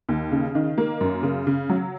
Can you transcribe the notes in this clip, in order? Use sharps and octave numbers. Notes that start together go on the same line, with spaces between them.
D#2
C#3
D#3
A#3
F#2
C#3
C#3
F#3